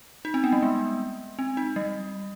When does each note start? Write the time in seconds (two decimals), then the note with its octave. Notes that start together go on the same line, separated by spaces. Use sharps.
0.25 D#4
0.34 C4
0.44 B3
0.52 G3
0.63 G#3
1.39 C4
1.57 D#4
1.76 G3